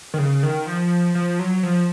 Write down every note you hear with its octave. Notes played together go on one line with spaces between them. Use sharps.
D#3
C#3
D#3
F3
F3
F#3
F3